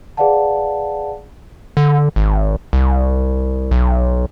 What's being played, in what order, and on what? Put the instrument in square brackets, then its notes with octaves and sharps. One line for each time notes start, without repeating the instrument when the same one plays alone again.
[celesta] G#4 B4 D5 F5 F#5 A5
[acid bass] D3
G#1
C2
B1